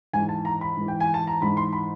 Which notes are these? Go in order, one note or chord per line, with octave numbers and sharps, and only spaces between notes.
G#2 E3 G#5
A5
A#5
B5
G#2 E3
G5
G#5
A5
A#5
G#2 E3 B5
C6
B5